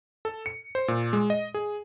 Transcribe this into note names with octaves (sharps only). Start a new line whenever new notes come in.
A4
C#7
C5
A#2
G#3
D#5
G#4